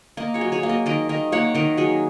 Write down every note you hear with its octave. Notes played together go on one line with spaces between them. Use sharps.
A#3 A#4 D#5
G#4 C#5
F#3
G#4 C#5
A#3
A#4 D#5
D#3 A#4 D#5
D#3 A#4 D#5
A#3 C#5 F#5
D#3 A#4 D#5
F#3 G#4 C#5